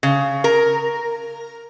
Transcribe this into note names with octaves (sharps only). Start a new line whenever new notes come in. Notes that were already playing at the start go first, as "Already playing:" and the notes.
C#3
A#4